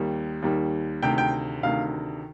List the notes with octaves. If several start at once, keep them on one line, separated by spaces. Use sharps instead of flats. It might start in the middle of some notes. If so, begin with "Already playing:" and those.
Already playing: D#2 D#3 G3
D#2 D#3 G3
D2 C3 D#3 G5
G5
D2 C3 D#3 F5